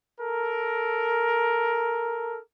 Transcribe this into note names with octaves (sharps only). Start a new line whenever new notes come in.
A4 A#4